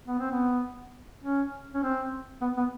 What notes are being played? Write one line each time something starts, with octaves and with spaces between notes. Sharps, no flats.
B3
C4
B3
C#4
C#4
C4
B3
B3